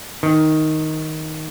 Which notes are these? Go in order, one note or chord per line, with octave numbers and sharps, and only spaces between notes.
D#3